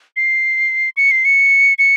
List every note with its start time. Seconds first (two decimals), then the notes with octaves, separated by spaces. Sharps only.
0.16 C7
0.97 C#7
1.11 C7
1.25 C#7
1.78 C#7